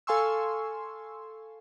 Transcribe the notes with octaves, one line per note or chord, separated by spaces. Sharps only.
A4 F5 G#5 C6 C#6 E6